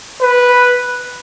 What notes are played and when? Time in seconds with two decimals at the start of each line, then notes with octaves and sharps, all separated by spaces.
0.21 B4